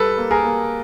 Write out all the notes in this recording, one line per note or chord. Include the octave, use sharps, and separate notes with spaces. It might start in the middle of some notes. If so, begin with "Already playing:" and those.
Already playing: G3 A4 B4
A#3
G#4 A#4
A#3